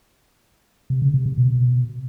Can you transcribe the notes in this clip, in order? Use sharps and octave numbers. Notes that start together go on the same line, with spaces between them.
C3
C#3
C3
C3
B2